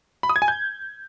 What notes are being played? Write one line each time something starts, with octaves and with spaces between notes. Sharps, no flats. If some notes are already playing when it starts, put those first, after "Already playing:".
B5
D#6
G#6
G#5
G6